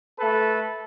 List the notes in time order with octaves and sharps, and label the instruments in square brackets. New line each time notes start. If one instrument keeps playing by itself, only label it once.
[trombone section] A3 A4 B4